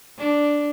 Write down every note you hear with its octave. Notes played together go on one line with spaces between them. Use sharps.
D4